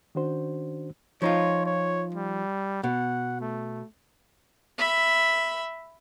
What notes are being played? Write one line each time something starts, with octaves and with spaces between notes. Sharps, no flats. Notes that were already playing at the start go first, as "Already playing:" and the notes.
D#3 C#4 D4 F#4 C5
F3 D#4 F4 C#5
C#5
G3
B2 F#5
A3
E5 B5